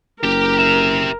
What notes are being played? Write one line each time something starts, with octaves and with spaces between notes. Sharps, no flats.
F#1 G4 A#4 G5
G4 E5